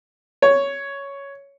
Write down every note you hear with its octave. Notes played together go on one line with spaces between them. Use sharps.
C#5